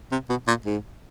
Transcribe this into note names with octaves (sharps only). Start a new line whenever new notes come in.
C3
B2
A#2
G#2